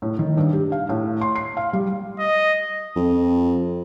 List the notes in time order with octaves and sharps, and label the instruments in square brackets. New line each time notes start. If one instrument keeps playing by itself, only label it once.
[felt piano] A2
D#3
G2
G4
F5
A2
C6
C7
F5
G3
[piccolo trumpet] D#5
[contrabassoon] F2